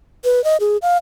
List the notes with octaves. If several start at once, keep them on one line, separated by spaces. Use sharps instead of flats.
B4
D#5
G#4
F5